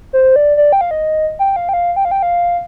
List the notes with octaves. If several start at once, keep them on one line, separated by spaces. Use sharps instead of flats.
C5
D5
D5
G5
F5
D#5
G5
F5
G5
F5
G5
F5
G5
F5